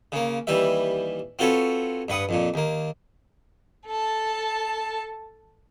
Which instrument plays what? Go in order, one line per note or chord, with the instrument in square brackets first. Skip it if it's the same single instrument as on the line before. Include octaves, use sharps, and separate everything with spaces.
[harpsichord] C#3 A#3
D#2 E3 G3 B4 E5
C4 F4 F#4 A4 B4 C#5
G2 B4 F#5 D#6
F2 A#2
D#2 A#3
[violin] A4 A5